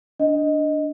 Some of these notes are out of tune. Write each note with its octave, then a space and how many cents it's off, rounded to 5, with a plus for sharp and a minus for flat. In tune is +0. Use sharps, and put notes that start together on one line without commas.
D4 +0 D#5 +0